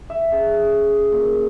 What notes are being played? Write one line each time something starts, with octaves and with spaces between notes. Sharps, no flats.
E5
C#3
A#2